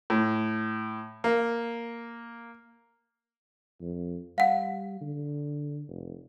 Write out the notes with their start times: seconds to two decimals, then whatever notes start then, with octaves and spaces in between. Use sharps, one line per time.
0.10 A2
1.24 A#3
3.81 F2
4.38 G3 F5 F#5
5.01 D3
5.89 F1